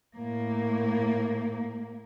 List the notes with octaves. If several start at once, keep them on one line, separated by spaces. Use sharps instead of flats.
A2 A#3